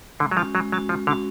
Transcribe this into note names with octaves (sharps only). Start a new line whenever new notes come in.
D3 G#3
F#3
F3 C#4 F#4
F#3 G#3
F#3 C#4 F#4
F3 G#3
D3 C#4 F#4